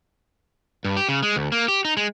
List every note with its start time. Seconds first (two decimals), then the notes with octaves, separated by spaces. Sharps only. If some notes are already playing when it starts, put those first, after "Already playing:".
0.85 G2
0.97 G4
1.09 C#3
1.23 G#3
1.36 D2
1.52 A#3
1.68 G4
1.85 D#4
1.97 G#3